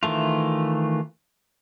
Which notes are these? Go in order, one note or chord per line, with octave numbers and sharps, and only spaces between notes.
D#3 E3 A3 F4